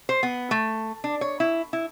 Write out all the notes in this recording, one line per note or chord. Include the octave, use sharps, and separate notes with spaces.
C5
B3
A3
D4
C#5
E4
E4